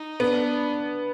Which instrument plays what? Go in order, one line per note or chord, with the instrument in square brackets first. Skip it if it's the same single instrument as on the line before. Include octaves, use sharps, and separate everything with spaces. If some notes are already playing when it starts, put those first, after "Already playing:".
Already playing: [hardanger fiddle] D#4
[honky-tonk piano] B3 [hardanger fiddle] D4